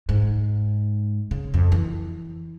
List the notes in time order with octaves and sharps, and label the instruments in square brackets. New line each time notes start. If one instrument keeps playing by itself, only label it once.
[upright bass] G#2
C#3
F2
E3